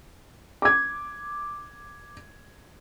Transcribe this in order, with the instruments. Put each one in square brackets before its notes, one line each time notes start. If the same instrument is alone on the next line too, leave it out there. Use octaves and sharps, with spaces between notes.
[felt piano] D6 G#6